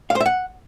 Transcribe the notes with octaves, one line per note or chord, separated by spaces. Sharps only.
F5
C5
E5
F#5